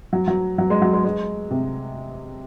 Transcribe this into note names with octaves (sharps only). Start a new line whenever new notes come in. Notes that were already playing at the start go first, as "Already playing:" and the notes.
F#3
F#3
F#3
G#3
F#3
G#3
G#3
C3